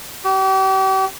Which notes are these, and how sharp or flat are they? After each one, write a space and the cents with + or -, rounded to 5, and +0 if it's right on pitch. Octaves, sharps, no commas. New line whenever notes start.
G4 -40